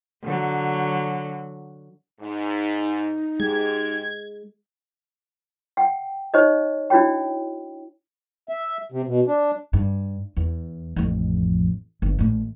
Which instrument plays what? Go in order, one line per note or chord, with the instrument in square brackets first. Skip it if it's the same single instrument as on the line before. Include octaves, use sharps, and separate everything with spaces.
[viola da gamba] D3 F#3
[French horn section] G#2 [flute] D#4
[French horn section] G#2 G4 [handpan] G#3 [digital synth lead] G#6
[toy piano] F#5 G5
D#4 G4 C5 C#5 D#5
D4 E4 F#4 C#5 G5
[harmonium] E5
C3
B2
D4
[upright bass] G2
E2
A1 F2
G1
A1 A2